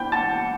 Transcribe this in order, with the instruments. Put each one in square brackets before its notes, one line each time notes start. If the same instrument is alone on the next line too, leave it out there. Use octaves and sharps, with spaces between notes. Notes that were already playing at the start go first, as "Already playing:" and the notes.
Already playing: [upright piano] G5 B5 G6
[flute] F#5 [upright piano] A5 A6